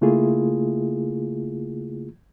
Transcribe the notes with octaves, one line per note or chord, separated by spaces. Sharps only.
C#3 A3 A#3 E4 F4 G#4